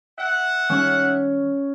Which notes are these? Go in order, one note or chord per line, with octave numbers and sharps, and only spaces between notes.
E5 F#5
D#3 G3 C#4